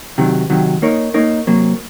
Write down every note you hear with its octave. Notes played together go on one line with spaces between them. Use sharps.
C3 D#3 F#3
C3 D#3 F#3
A#3 D#4 A#4 C#5
A#3 D#4 A#4 C#5
C3 F#3 A#3